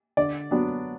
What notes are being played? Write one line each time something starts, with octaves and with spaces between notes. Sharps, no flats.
D3 D5
F#3 B3 D4